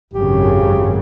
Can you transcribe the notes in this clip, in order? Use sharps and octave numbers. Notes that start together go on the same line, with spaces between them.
G#1 F#2 C#3 G4